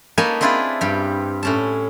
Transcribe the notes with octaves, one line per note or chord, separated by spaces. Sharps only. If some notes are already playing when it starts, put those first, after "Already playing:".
A#3 D#4 B4 C#5 G#5 A5
C4 D4 E4 F4 G#4 B4
G2 G4
A2 C#4 A5